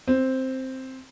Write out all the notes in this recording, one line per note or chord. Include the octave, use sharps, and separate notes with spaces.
C4